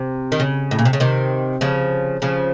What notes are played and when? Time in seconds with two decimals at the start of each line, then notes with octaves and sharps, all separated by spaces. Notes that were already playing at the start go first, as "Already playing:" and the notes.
Already playing: C3
0.32 D#3
0.40 C#3
0.71 A2
0.79 A#2
0.85 C3
0.93 C#3
1.00 C3 D#3
1.61 C#3 F3
2.22 C#3 F3